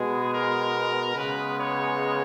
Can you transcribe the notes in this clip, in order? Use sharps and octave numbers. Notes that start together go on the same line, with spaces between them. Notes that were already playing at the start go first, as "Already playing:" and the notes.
Already playing: B2 G#3 B3 G#4
A#4
C#3 G#3 B3 B4
C#5